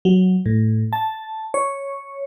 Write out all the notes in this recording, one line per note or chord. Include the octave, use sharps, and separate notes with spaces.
F#3
A2
A5
C#5